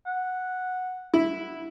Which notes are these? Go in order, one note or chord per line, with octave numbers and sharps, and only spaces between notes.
F#5
E4